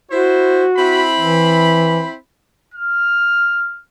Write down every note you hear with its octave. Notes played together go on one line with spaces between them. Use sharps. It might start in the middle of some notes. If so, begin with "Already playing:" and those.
E4 F#4 C5
C4 E4 B5
E3
F6